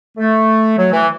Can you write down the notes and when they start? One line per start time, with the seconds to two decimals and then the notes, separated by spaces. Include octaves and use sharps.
0.17 A3
0.77 F#3
0.92 E3